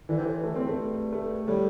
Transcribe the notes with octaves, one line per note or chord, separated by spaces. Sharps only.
D3 E3
C3
A2
G2
A2 A3
G2
C4
A2
G2 A3
A3
A2 G3